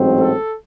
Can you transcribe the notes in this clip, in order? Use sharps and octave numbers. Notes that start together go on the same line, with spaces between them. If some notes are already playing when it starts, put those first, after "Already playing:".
Already playing: A1 G#2 F#3 C4
A4